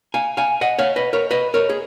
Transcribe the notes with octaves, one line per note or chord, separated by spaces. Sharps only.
F5 G#5
F5 G#5
D#5 F#5
C#5 F5
B4 D#5
A#4 C#5
B4 D#5
A#4 C#5
G#4